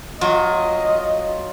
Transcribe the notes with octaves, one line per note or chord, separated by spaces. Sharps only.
F#3 F4 D#5